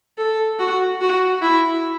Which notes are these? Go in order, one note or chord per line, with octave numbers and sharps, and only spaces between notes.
A4
F#4
F#4
E4